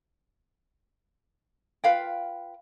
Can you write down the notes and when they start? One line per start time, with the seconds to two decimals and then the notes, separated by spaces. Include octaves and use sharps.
1.84 F4 B4 F5 G5